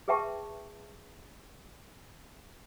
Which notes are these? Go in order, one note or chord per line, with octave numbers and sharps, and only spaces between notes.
G#4 B4 E5 G5 A5 C#6